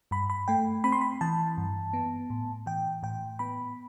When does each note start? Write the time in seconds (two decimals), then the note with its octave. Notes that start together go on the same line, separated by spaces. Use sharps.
0.11 G2 B5
0.30 B5
0.48 A3 G5
0.84 C4 B5
0.92 C6
1.01 B5
1.21 E3 A5
1.58 G2
1.93 B3
2.30 A2
2.66 E3 G5
3.03 A2 G5
3.39 B3 B5